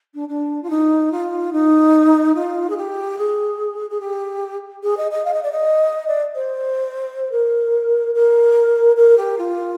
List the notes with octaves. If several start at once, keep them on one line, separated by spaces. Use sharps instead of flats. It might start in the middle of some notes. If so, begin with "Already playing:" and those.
D4
D4
F4
D#4
F4
D#4
F4
G#4
G4
G#4
G#4
G4
G#4
D#5
D#5
F5
D#5
D5
D#5
D5
C5
A#4
A#4
A#4
G4
F4